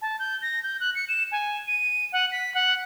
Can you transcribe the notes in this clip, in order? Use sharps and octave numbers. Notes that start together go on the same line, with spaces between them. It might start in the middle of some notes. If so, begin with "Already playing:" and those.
A5
G6
A#6
G6
F#6
C#7
E7
G#5
D#7
F#5
B6
F#5